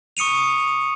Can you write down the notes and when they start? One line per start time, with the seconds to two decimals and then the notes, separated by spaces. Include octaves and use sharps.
0.17 C#6 D#6 C#7 D#7 F7